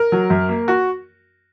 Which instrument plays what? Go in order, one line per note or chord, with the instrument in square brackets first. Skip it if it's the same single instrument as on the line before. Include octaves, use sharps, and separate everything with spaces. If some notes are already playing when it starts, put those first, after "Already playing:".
Already playing: [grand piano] A#4
F#3
F#2
A#3
F#4